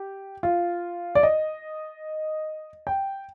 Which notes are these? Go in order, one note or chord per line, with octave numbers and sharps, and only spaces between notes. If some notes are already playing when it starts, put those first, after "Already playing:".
Already playing: G4
F4
D5
D#5
G5